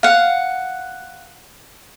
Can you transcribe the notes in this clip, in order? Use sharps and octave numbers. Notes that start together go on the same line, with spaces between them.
F5 F#5